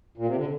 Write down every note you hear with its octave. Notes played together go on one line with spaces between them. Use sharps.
A#2
C3
D3